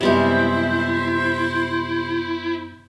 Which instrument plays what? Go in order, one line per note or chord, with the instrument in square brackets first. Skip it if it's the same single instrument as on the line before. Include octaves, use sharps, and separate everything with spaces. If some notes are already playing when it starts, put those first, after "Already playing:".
[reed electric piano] F#2 B3 [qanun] C3 G3 G#3 [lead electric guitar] E4 [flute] C5